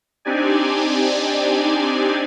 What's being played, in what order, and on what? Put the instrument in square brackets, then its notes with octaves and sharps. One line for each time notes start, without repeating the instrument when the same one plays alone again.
[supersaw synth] C4 D4 D#4 G4 D5 G#5